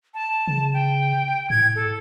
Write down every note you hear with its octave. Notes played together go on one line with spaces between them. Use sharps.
A5
C#3
G5
A2 G#6
A4